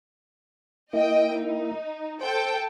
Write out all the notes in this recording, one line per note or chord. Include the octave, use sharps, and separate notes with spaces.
A#3 E4 D#5 G5
D#4
A4 C5 G5